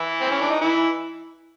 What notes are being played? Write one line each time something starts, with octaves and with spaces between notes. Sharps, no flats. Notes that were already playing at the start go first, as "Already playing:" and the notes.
Already playing: E3 E4
C4
C#4
D4
D#4
E3 E4